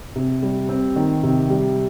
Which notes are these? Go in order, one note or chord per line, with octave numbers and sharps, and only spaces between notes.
C3
G3
C4
D#3
C3
G3